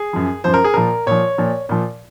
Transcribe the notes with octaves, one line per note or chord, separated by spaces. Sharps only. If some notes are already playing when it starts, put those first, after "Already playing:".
Already playing: G#4
F#2 F3
F#2 F3 C5
A#4
G#4
A#2 F3 A#4
A#2 F3 C#5
A#2 F3
A#2 F3